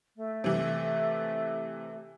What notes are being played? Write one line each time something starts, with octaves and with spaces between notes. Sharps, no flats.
A3
C3 E3